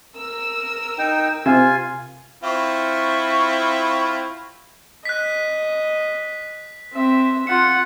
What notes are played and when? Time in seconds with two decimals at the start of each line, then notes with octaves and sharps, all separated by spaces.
0.18 A#4 E6
0.98 D#4 G5
1.46 C3 F4 G#5
2.44 C4 E4 F4 C#6
5.05 D#5 F#6 B6
6.93 C4 E5
7.47 F4 F#5 C#7